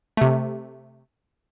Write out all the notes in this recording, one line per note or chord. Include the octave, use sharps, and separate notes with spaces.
C3 A3